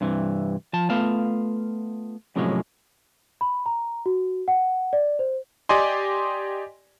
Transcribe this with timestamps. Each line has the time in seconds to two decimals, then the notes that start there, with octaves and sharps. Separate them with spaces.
0.01 G2 C3 E3
0.73 F3 A5
0.90 A3 B3 F4 F5 A5
2.36 F#2 A2 C3 F3 F#3 G#3
3.41 B5
3.66 A#5
4.06 F#4
4.48 F#5
4.93 D5
5.19 C5
5.69 G4 D5 D#5 G#5 C6